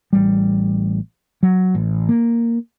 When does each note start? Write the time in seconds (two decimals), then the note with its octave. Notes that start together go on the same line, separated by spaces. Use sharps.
0.13 A1 G3
1.43 F#3
1.75 A1
2.09 A#3